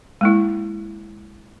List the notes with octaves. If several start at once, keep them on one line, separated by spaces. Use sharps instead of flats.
G#3 A#3 E4